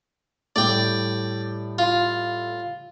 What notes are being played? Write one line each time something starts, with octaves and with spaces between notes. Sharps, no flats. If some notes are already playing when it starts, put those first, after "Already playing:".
A2 G3 A3 D5 G5
F4